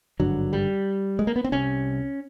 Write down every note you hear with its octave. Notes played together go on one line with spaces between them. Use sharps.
G#1 G2 D3 F#3
G3
G#3
A#3
B3
C4
C2 C3 C#4